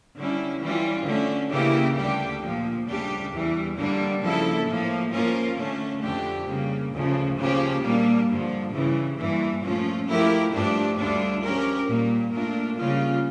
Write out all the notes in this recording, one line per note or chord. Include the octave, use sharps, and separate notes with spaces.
D3 G3 C#4 E4
E3 G3 C#4 F4
D3 A3 C#4
C#3 E3 A#3 E4 G4
D2 D3 G3 D4 G4
A#2 F3 A#3
D2 C#3 G3 D4 G4
E2 E3 G3
G2 D3 G3 A#3 D4
C#3 F3 A#3 E4 A4
A2 F3 A#3
F3 A#3 C#4 F4 A#4
D3 A3 C#4
F2 D3 A3 D4 G4
C#3 G3 A#3
D2 C#3 F3
C#3 F3 A#3 C#4 G4
A#2 G3 A#3 D4
G2 D3 F3
C#3 E3 G3
G2 E3 G3 A#3
A#2 F3 A3 C#4 F4
F3 A3 E4 G4 A#4
G2 F3 A3 D4 G4
D2 D3 G3 D4 F4
F3 C#4 G4 A#4
A#2 G3 A#3
A#2 A3 D4 F4 A#4
C#3 G3 A#3 C#4 F4